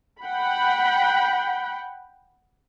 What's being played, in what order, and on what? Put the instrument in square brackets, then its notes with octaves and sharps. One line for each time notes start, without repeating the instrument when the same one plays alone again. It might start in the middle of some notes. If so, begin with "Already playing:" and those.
[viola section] F#5 G5 B5